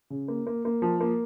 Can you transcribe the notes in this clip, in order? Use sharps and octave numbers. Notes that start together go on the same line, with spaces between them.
C#3
A#3
A#3
A#3
F3
A#3